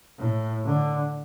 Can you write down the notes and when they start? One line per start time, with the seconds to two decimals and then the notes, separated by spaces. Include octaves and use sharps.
0.19 A2
0.64 D3